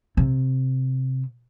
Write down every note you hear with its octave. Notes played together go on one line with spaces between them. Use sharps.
C3